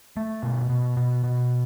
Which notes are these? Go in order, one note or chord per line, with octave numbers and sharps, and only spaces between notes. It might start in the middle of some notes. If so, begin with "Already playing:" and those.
A3
B2
B2
B2
B2